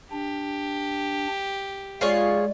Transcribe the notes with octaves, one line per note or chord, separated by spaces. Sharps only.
D4 G4
G#3 F4 G#4 C#5 D5